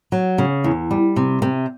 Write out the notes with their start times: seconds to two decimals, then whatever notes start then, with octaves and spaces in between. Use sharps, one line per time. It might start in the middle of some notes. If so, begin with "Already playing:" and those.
0.12 F#3
0.38 C#3
0.64 E2
0.91 G3
1.16 C3
1.42 C3